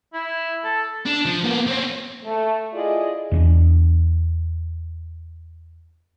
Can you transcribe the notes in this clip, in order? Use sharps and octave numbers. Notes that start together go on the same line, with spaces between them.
E4
A4
D4
F3
A#3 B3
C4 C#4
A3
E4 F4 G#4 D5 D#5
E2 C4 D4